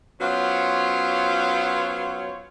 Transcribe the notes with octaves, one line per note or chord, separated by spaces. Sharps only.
F#3 B3 C#4 F4 C5 C#5